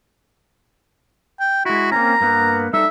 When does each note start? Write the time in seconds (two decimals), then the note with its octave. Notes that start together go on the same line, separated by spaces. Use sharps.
1.40 G5
1.65 G#3 E4 F#4
1.92 A#3 C4 C#4 A#5
2.21 G2 A#3 B3
2.73 G3 D#4 A4 E5